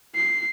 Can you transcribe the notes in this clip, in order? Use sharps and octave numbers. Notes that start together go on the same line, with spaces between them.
C7